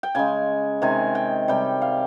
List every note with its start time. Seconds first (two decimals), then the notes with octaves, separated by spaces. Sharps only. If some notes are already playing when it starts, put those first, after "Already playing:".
0.03 G5
0.15 C#3 G#3 G#5
0.82 C3 D#3 G#3 G#5
1.15 G5
1.48 C3 G3 G5
1.82 F5